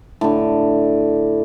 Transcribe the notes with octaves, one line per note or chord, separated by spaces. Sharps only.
A2 D3